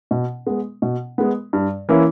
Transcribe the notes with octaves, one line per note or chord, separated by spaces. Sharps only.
B2
G#3 B3
B2
G#3 B3
G2
E3 A#3 C#4 E4